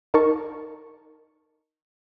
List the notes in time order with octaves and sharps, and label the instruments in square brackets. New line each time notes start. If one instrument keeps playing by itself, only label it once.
[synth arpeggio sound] D#4 A#4 A5 C#6